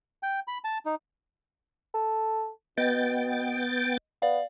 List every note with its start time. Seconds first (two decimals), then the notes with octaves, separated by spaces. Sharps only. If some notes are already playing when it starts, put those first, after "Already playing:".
0.23 G5
0.48 B5
0.64 A5
0.86 D#4
1.94 A4
2.78 B2 B3 D#5 G5 A6
4.22 B3 D5 F5